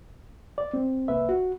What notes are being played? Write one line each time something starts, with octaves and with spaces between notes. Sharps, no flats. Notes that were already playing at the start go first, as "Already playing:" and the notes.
D5
C4
C2 A#3 B4 E5
F#4